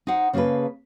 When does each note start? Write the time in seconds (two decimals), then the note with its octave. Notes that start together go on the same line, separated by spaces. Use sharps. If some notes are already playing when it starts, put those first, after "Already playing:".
0.07 D#4 C5 F#5
0.33 C#3 A#3 G#4 A4 B4